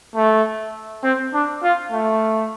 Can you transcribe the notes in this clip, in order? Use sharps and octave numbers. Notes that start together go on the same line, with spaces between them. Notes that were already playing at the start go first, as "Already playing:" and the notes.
A3
C4
D4
F4
A3